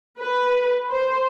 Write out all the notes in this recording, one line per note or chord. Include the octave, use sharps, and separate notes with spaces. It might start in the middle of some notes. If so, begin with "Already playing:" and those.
B4
C5